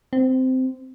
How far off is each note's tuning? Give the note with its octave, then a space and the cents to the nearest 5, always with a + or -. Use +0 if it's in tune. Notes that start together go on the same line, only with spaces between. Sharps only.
C4 -15